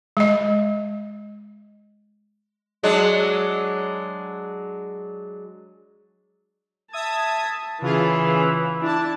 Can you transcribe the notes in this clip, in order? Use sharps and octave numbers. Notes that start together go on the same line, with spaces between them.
G#3 D#5
F#3 G#3 D4
E5 A5 D#6 G#6
C#3 E3 F4 G#4
D4 E4 A5